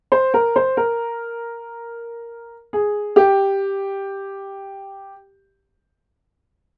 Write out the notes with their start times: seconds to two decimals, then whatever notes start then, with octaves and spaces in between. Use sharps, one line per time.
0.12 C5
0.34 A#4
0.56 C5
0.77 A#4
2.73 G#4
3.16 G4